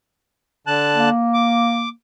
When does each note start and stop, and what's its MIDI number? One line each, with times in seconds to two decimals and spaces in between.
0.67 1.09 50
0.67 1.09 81
0.67 1.09 90
0.95 1.90 58
1.34 1.89 86